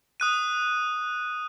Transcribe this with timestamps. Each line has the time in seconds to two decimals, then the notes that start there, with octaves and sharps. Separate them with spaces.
0.20 D#6 F#6 D#7